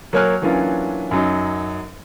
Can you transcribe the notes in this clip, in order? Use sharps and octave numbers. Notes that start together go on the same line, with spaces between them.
F#3 A#3 C#5 G#5 F6 F#6
E3 F#3 A#3 C#4 D4 F4
F#2 F#3 D#4